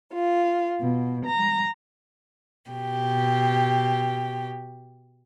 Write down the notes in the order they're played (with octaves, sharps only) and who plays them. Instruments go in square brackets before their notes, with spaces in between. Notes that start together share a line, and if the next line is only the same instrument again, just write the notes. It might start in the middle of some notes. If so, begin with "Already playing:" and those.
[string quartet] F4
B2
A#5
B2 G4